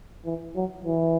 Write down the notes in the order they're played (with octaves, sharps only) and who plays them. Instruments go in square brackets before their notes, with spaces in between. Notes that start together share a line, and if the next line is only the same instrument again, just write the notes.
[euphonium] E3
F#3
E3